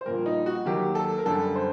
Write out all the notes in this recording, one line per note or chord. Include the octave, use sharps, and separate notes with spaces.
C5
A#1 A#2 G3 A#4
D#4
F#4
D#2 D#3 F#3 G4
A4
A#4
F#2 D3 G3 A4
C5